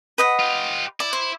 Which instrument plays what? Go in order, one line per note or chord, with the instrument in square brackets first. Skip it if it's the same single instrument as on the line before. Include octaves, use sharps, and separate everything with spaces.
[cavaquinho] B4 D#5 F#5
[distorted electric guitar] F4 G4
[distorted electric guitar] E4 [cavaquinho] D5
[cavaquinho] C5